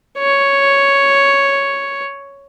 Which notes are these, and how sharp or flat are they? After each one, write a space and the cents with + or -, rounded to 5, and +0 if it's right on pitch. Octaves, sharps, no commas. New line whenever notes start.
C#5 +0